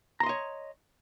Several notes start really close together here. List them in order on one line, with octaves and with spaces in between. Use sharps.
A#5 C6 D#5 C#5